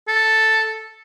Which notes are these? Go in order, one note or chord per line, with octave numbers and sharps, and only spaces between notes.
A4